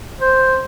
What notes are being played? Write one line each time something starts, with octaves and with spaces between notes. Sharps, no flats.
C5